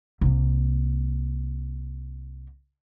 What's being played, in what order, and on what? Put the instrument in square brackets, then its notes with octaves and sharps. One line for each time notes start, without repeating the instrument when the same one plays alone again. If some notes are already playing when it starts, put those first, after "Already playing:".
[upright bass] C2 A#3